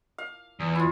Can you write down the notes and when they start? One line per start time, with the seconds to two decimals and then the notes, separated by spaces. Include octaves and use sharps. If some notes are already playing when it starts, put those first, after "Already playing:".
0.18 F5
0.60 E2
0.75 E4 F4